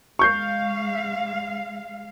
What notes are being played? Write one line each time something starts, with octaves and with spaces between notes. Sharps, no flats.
G#3 F5 C#6 G6 C7